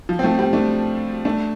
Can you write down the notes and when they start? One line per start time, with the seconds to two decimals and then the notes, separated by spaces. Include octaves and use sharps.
0.09 F3
0.19 C4
0.24 F3 A3
0.39 G3 C4
0.53 A3 D4
1.25 A3 D4